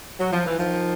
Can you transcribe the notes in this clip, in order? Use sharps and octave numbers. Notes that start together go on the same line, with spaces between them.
F#3
F3
E3
D#3 F3